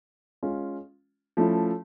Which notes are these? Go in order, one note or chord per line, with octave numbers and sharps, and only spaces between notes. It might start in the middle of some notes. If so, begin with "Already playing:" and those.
G#3 C#4 F4
F3 A3 C#4 E4